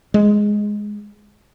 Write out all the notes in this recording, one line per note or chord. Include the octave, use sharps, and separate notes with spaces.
G#3